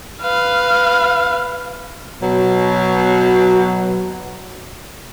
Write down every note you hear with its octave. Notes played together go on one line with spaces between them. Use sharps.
B4 F5
B2 F#3